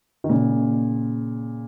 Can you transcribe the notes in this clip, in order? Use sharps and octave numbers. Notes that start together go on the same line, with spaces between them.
D#3
A#2 C#3